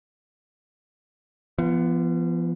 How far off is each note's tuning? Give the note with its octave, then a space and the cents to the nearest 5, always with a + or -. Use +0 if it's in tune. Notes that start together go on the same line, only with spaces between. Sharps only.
F3 -40 B3 +0